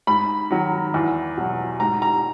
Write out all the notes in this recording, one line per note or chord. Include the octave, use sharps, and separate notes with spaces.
G#2 B5
D#3 F#3
E2
B2 F#3
G#2 A#5
A#5